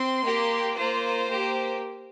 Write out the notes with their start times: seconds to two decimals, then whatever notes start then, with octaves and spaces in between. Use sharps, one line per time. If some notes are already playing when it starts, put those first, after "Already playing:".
Already playing: C4 C6
0.25 A#3 G4
0.78 A#3 F4 C5
1.30 A#3 G4